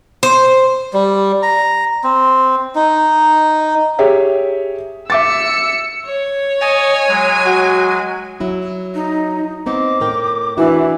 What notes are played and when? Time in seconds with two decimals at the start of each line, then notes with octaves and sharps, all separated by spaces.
0.23 C5
0.93 G3
1.43 A#5
2.04 C4
2.75 D#4
3.99 G4 G#4 C#5 E5
5.10 E5 D6 E6 A6 C#7
6.05 C#5
6.61 D#5 G#5 C#6 A6
7.08 F#3 G#3
7.46 F#4
8.40 F#3 E4 F#4
8.94 D#4
9.66 B3 C4 D#4 D6
10.01 A2 A#4 G5
10.58 E3 D4 E4 F#4